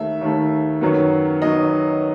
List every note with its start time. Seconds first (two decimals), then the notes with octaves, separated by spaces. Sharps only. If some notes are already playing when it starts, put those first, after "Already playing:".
Already playing: D#2 D#3 A3 E5
0.21 D#2 D#3 A3
0.81 F#2 D#3 F#3 B3
1.42 D#3 F#3 B3 D#5